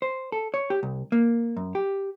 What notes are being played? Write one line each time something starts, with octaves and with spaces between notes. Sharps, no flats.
C5
A4
C#5
G4
C2
A#3
F#2
G4